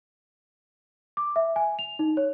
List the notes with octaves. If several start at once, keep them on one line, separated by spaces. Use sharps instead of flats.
D6
E5
G#5
F7
D#4
C#5